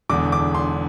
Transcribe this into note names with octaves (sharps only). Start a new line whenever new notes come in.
E1 E2 D3 D6
D6
C6